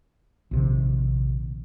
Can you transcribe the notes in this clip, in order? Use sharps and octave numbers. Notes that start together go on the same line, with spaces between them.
A#1 C3 D#3